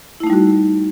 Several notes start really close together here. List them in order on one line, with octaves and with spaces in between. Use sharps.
E4 A3 D#4 G3 F#4